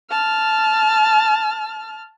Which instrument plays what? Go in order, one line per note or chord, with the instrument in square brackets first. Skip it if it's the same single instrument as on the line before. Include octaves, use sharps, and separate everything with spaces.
[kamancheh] A5 F6